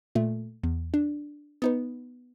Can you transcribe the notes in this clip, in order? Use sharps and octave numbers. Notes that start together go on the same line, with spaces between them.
A#2 A3
E2
D4
B3 D#4 B4